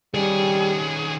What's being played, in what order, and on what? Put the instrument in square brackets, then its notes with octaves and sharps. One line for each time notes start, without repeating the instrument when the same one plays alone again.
[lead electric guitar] D#3 C#4 [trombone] G3 [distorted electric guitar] G#4